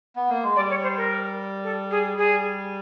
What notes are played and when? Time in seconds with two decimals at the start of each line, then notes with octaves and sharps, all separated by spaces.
0.16 B3
0.30 A#3
0.43 G#3
0.56 G3 D5
0.70 C#5
0.83 C5
0.97 A#4
1.64 A4
1.91 G#4
2.18 G3 G#4